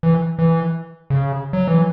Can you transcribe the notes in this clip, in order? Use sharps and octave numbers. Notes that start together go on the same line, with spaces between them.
E3
E3
C#3
F#3
E3